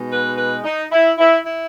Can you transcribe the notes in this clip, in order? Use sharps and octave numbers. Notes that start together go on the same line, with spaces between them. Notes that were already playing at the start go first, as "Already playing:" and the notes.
Already playing: B2 G#3 D#4
B4
B4
D#4
E4
E4
E4